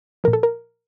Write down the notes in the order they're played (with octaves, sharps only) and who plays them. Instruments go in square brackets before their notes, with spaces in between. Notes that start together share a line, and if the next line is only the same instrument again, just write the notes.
[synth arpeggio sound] A#2 F3 A#4
A4
A#4